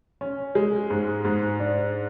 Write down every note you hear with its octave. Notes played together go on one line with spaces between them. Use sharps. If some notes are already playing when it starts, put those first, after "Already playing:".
C#4
G#3
G#2
G#2
D4